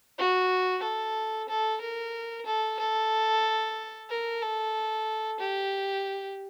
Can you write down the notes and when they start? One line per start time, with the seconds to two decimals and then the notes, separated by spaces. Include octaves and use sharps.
0.19 F#4
0.83 A4
1.49 A4
1.81 A#4
2.46 A4
2.80 A4
4.10 A#4
4.42 A4
5.40 G4